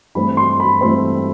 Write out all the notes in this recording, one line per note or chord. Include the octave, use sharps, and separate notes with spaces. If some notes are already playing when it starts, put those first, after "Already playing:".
G2 E3 A3 C4 B5
C6
B5
G2 E3 A3 C4 C6